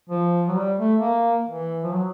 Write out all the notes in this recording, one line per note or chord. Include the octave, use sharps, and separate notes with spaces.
F3
F#3
G3
A3
A#3
E3
F3
F#3